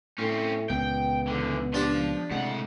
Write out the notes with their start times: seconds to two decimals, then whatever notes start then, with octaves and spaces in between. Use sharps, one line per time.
0.18 A2 C4 C#4
0.70 C#2 A#2 B3 G5
1.28 E2 D3
1.74 F3 D4 G4 C6
2.31 A2 C3 G#3 F#5